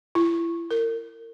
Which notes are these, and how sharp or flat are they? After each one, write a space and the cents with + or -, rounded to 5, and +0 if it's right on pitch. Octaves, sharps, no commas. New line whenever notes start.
E4 +30
A#4 -30